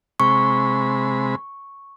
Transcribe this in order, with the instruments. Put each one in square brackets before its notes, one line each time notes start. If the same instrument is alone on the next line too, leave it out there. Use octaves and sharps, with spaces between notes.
[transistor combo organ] C3 G#3 B5 [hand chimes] C#6